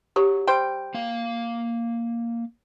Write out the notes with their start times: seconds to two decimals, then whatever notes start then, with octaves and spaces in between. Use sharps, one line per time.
0.16 F#3 G4 C#5
0.47 G3 C5 G5
0.94 A#3 F5